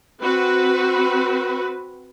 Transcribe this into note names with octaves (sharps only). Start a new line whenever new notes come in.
C4 F#4 B4